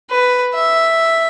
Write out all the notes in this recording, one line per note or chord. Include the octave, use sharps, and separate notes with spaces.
B4
E5